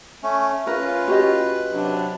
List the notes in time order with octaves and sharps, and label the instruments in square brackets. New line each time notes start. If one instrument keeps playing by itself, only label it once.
[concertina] A3 C#4
[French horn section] C#4 F4 [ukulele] A#4 [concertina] B4
[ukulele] F#4 G4 D#5
[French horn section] C3 F#3 D4